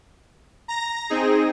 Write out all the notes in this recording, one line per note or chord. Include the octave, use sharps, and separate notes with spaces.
A#5 A#6
C4 D#4 G#4